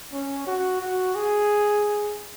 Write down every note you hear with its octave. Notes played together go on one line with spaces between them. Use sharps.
C#4
F#4
F#4
G#4